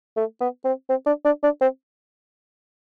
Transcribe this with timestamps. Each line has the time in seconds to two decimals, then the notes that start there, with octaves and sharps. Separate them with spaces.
0.17 A3
0.41 B3
0.65 C4
0.90 C4
1.07 D4
1.25 D4
1.43 D4
1.62 C4